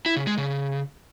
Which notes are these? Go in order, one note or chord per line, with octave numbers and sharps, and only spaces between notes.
E4
C#3
G#3
C#3